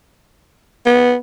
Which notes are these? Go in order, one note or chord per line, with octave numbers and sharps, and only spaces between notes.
B3